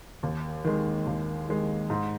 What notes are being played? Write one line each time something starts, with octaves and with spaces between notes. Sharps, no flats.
D#2
D#3 G#3
D#2
D#3 G#3
G#2